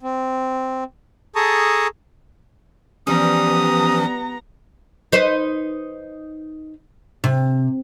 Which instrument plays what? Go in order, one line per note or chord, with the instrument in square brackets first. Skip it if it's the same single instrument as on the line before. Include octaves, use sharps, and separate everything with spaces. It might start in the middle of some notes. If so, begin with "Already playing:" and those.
[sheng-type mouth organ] C4
G#4 A4 A5 A#5 C#6 D#6
[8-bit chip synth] E3 F3 C#4 [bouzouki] G3 [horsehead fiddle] B3 A#5 [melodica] D#6
[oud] D#4 B4 C5
C3